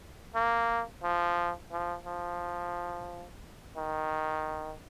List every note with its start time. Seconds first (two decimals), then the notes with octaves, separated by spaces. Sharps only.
0.35 A#3
1.03 F3
1.71 F3
2.06 F3
3.77 D#3